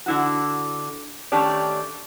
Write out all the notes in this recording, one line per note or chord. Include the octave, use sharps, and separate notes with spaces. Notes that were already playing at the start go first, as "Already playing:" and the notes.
D3 E4 F#4
D#3 A3 C#4 D4 G4 D5